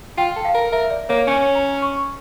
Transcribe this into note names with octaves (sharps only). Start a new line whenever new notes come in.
F4 G5
A4
F5
A#4
A#4 E5
D5
A#3 C#5
C#4 C#5
A#5
C#6